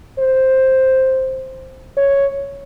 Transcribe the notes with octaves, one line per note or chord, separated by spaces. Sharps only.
C5
C#5